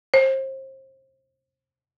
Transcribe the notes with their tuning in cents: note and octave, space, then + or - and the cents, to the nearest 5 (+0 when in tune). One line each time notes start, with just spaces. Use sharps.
C5 +30